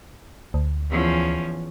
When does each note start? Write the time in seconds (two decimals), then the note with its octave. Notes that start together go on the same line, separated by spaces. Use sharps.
0.54 D2
0.90 E2 F3 C#4